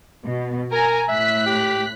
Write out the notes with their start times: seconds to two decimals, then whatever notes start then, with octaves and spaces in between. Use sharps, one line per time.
0.25 B2
0.72 A#4 G#5 A#5
1.09 A2 E5 F#6 B6
1.46 G4